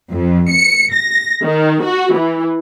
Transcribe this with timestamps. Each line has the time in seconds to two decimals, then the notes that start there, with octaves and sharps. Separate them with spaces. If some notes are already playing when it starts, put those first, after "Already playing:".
0.10 F2
0.51 C#7
0.95 A#6
1.43 D#3
1.84 F#4
2.13 E3